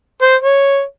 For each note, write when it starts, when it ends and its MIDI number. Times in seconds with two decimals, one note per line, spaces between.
0.22 0.34 72
0.42 0.82 73